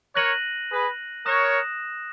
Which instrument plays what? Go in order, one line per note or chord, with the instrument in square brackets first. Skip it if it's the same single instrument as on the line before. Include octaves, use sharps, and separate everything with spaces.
[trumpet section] A#4 C#5 [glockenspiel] F#6 A#6 D#7 F#7
[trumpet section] G#4 B4
[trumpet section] A#4 C#5 [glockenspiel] D#6 F#6 A#6 E7